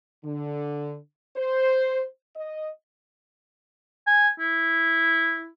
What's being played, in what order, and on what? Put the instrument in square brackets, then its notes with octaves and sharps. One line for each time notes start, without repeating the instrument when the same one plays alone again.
[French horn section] D3
C5
D#5
[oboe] G#5
E4